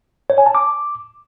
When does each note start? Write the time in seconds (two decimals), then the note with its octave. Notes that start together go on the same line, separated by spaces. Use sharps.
0.30 C#5
0.38 G#5
0.46 A5
0.55 D6